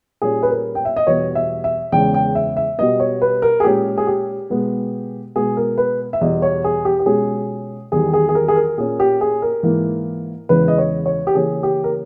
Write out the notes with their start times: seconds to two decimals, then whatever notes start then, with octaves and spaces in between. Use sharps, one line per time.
0.22 A#2 G3 C#4 G#4
0.43 B4
0.50 A#4
0.75 G5
0.85 E5
0.96 D#5
1.07 E2 B2 G3 B3 C#5
1.35 E5
1.64 E5
1.92 E2 C#3 G#3 C#4 G5
2.14 G5
2.35 E5
2.57 E5
2.78 B2 G3 B3 D#5
3.00 C#5
3.22 B4
3.42 A#4
3.60 G#4
3.64 A#2 G#3 C#4 G4
3.98 G#4
4.07 G4
4.50 B2 G#3 B3
5.36 B2 G#3 B3 G#4
5.57 A#4
5.78 B4
6.13 E5
6.21 E2 B2 G3 D#5
6.42 C#5
6.64 G#4
6.85 G4
6.99 G4
7.06 B2 G#3 C#4 G#4
7.92 E2 D#3 G3 G#4
8.13 G#4
8.29 G#4
8.35 A#4
8.48 G#4
8.56 A#4
8.78 A#2 A#3 C#4 G#4
9.00 G4
9.21 G#4
9.42 A#4
9.63 G#2 E3 A#3
10.49 E2 C#3 E3 G#3 B4
10.68 D#5
10.78 C#5
11.06 C#5
11.27 G4
11.35 C#3 E3 A#3 C#4 G#4
11.63 G4
11.84 A#4